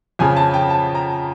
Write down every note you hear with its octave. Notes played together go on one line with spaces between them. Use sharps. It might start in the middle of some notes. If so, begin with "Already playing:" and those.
F2 C#3 F3 G#5
A5
G5
A5
A#5